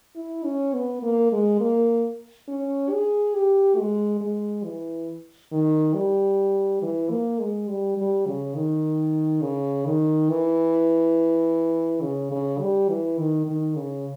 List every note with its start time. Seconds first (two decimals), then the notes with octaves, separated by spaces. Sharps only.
0.16 E4
0.45 C#4
0.73 B3
1.03 A#3
1.32 G#3
1.61 A#3
2.48 C#4
2.91 G#4
3.35 G4
3.78 G#3
4.21 G#3
4.65 E3
5.52 D#3
5.95 G3
6.82 E3
7.10 A#3
7.40 G#3
7.68 G3
7.97 G3
8.27 C#3
8.55 D#3
9.42 C#3
9.86 D#3
10.29 E3
12.02 C#3
12.32 C#3
12.60 G3
12.89 E3
13.19 D#3
13.46 D#3
13.76 C#3